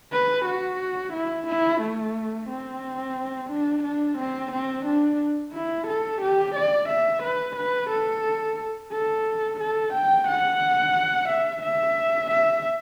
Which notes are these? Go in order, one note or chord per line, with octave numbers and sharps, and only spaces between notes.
B4
F#4
E4
E4
A3
C4
D4
D4
C4
C4
D4
E4
A4
G4
D5
E5
B4
B4
A4
A4
A4
G5
F#5
E5
E5
E5